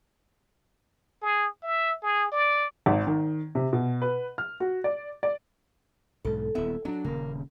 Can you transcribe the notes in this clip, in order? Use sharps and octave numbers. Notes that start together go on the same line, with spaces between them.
G#4
E5
G#4
D5
G#1
D#3
C3
B2
B4
F6
F#4
D5
D5
B1 G#2 A4
D#1 B3 E4 E5
F#3 C#4 D4
D#1 C#3 A#3